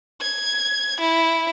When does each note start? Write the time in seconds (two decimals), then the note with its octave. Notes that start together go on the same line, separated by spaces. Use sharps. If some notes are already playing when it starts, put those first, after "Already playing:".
0.21 G#6
1.00 E4